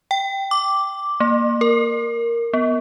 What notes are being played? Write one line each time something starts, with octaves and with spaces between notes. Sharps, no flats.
G5
D6
A#3
A#4
B3